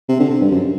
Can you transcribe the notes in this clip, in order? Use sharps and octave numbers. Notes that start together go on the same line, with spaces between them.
C3
D3
C3
G2
F#2